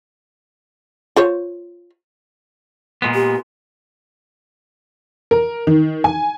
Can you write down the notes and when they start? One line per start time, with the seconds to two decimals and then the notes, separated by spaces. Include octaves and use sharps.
1.16 F4 C5 C#5
3.02 A#2 G#3 B3
3.14 G4
5.31 A#4
5.67 D#3
6.04 G#5